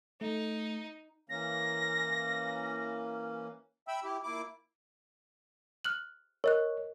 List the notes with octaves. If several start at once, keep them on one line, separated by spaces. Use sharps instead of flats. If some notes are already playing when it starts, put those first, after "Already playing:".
A3 D#4
E3 A#3 C#4 A#6
E5 G5 B5 E6
E4 G4
A#2 E4 D6
F6 F#6 F#7
A#4 C#5 D#5 F#6